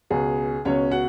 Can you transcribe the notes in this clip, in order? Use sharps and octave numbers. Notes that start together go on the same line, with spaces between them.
C#2 B2 G#4
C#2 B2 C#4 C#5
F#4 F#5